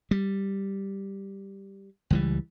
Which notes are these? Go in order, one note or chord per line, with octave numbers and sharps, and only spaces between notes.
G3
C#2 E3 G3